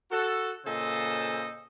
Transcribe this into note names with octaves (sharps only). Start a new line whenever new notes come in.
F#4 A4
A#2 C#3 A4 C5 D#5